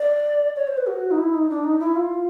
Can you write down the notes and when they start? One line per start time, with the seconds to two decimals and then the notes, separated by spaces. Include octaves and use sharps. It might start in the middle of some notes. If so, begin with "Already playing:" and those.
Already playing: D5
0.56 C#5
0.67 C5
0.77 B4
0.87 F#4
1.11 D#4
1.18 E4
1.34 D#4
1.50 D4
1.64 D#4
1.80 E4
1.96 F4